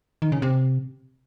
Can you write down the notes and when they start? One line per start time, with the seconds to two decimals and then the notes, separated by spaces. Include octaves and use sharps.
0.22 D#3
0.32 C#3
0.42 C3